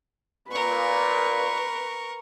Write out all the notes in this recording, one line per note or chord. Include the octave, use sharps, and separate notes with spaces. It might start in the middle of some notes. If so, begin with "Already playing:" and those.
A#2 A#4 B4 C#6